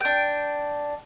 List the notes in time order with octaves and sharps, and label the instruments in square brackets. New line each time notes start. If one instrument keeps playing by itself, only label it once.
[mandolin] D4 G5